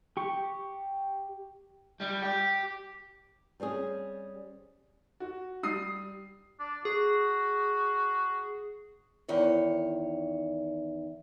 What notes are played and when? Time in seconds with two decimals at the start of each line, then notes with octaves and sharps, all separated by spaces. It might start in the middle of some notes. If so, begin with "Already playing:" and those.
0.17 G4 C#6
2.01 G3
2.23 G4
3.60 G3 C4 C#4 G#4
5.20 F#4
5.63 G3 D#6 C7
6.59 D4
6.85 F#4 G#4
9.28 E2 D#3 C#5